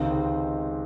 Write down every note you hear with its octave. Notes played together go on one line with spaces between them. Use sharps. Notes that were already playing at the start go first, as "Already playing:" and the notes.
Already playing: C#2 C3 D#3 G#3 C4